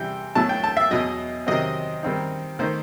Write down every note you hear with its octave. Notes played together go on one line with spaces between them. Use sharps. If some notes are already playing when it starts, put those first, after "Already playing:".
Already playing: C3 E3 G3 G5
B2 F#3 A3 E4 A5
G5
A5
E5
E2 B2 F#3 D#5
C3 D#3 F#3 C4 D#5
D#3 G3 C4 D#4
D#3 A3 D#4 C5